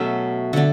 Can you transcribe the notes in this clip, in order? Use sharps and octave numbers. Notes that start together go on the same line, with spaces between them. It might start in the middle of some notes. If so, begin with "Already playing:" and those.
Already playing: B2 F#3 A3 C#4 E5 F#5
D3 A3 D4 F#5